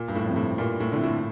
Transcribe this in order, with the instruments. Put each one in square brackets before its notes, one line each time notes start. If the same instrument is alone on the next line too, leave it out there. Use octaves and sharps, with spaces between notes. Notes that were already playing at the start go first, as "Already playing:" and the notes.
Already playing: [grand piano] A#2
G2
A2
[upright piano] F2 C3
[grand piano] A2
[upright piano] G2 [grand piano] A#2
[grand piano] A2
[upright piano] D3 A3 C4 E4
[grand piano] A2